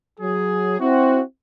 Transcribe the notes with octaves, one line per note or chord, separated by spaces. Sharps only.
F#3 G#4
C4 E4 F#4